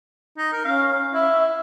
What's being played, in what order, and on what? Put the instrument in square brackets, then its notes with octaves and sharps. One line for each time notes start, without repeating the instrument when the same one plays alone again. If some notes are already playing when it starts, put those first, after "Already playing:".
[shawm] D#4
A#4
[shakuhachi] C#4 [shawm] F5
[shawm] E4 [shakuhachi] E5